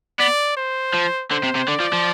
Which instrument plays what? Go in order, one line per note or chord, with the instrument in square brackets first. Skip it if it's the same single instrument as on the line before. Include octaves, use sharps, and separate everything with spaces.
[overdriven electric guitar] B3 [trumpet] D5
[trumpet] C5
[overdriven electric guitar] F3
[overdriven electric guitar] D3 [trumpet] C5
[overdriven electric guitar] C3
C3
[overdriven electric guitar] D3 [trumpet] D5
[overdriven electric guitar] F3
F3